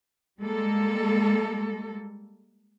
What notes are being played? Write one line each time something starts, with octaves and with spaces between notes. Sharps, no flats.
G3 G#3 A#3 A4